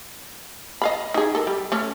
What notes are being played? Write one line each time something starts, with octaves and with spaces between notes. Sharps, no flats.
D#5 F5 B5
D#4 G#4
A4 A#4
G3
A3 C#4